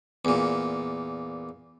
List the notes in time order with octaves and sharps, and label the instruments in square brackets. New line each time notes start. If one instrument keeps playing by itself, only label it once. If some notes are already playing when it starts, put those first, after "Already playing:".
[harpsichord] E2 A#2